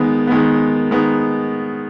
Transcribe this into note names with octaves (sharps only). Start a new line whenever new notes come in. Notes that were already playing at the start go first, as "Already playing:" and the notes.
Already playing: D#3 G#3 B3
D#3 G#3 B3
D#3 G#3 B3